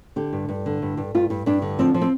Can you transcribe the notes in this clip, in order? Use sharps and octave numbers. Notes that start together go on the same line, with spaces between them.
D3 G4
G2
G2
D3
G2
G2
G2 F4
G2
G2 D4
D3
F3 C4
F3
C4